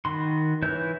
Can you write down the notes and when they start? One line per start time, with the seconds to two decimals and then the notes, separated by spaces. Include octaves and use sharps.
0.05 D#3 F#4 B5 C6
0.62 E3 E4 B4 C#5 G6